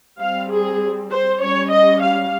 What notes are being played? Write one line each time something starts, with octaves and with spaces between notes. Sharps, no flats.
G3 C4 F5
G#4
C5
G3 C#4 C#5
D#5
F5